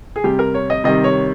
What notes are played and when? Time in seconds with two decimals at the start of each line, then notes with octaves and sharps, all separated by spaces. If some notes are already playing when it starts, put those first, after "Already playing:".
0.16 G#4
0.24 C3 G3 G4
0.39 A#4
0.54 C#5
0.70 D#5
0.84 C3 D#3 G3 D#5
1.04 C#5